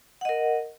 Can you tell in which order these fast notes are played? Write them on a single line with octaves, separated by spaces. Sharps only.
F#5 D#5 A#4